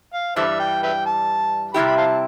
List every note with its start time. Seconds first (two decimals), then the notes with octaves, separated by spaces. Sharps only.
0.14 F5
0.36 G2 E3 G3 A4 C5 E5
0.60 G5
0.83 B4 E5 G5
1.06 A5
1.74 C3 G3 C4 E4 G4 B5
1.87 B5
1.97 C5 F5 A5